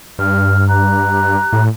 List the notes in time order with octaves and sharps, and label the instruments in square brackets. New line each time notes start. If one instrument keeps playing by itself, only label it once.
[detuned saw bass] G2 [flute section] F6
[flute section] G4 A#5 F#6
[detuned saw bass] A2